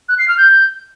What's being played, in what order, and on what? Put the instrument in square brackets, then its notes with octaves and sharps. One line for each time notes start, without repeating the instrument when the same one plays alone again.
[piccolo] F#6
C7
F6
G6